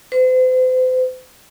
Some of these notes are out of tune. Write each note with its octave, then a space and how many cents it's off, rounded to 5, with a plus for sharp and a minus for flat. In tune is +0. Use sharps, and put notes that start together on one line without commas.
C5 -40